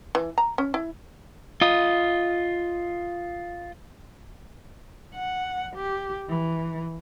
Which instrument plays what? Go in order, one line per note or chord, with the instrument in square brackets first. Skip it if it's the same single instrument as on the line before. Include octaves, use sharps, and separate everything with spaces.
[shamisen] E3
A#5
C#4
E4
[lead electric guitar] F4 D#5
[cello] F#5
G4
E3